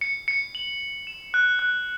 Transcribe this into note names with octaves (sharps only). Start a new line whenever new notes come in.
C#7
C#7
F#7
F#7
E7
F#6
F#6